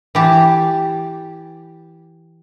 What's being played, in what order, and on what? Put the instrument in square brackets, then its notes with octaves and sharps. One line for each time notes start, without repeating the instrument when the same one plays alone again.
[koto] E3 G4 A5